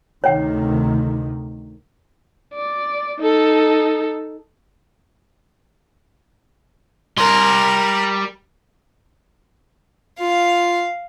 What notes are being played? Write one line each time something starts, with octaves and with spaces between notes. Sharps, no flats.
D2 C3 D#3 C#5 G5
D5
D#4 A4
G3 A#4 C6
F4 F5